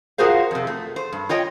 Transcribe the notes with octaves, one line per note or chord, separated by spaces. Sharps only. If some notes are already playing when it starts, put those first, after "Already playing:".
F4 F#4 G#4 A#4 C5 F5
F2 C3
A3
C5
G2
F4 C#5 D#5 G5